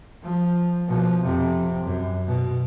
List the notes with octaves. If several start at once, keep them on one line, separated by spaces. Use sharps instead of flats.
F3
B2 F3
F2 C3
F#2
B2